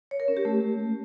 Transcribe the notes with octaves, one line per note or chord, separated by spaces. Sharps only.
C#5
A#4
C#4
G4
A3